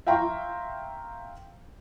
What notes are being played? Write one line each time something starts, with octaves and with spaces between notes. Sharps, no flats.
E5 F5 G5 A#5 C6 C#6